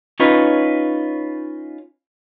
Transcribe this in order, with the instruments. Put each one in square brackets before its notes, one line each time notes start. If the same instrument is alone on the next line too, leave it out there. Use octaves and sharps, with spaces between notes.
[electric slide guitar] C#4 D#4 F4 B4 C#5